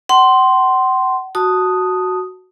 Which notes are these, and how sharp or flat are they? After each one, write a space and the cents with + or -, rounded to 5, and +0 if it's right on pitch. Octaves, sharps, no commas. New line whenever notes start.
F#5 +40 C6 +0
F#4 +0 A5 +0 D#6 +0